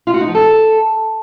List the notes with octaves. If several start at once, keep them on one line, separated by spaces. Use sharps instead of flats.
F4
F#4
D#4
F3
A4